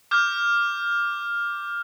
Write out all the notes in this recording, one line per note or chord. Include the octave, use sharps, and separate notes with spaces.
D6 F6 G6